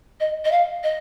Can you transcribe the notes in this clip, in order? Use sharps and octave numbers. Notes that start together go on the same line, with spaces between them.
D#5
D#5
F5
D#5